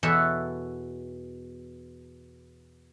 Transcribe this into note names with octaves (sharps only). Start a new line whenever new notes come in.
E2 B2 F#4 A4 C#5 E5